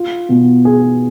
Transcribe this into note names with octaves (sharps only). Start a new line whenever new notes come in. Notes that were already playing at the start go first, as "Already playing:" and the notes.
Already playing: F4
B2
G#4